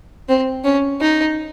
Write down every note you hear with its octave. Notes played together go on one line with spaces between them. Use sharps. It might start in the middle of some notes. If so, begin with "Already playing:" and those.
C4
C#4
D#4